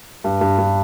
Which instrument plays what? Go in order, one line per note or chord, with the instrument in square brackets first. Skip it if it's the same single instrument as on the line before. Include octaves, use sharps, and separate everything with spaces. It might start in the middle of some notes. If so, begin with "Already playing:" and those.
[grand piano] G2
G2
G2